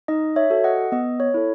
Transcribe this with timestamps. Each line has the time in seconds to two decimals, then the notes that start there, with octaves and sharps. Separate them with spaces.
0.08 D#4 D#5
0.36 C#5 E5
0.50 F#4 A4
0.64 D#5 F#5
0.92 B3 D#5
1.20 C#5
1.34 E4 A4